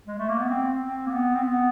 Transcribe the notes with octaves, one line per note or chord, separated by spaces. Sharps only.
G#3
A3
A#3
B3
C4
C4
A#3
B3
C4
B3